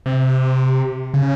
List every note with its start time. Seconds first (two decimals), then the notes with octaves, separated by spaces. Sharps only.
0.06 C3
1.14 C#3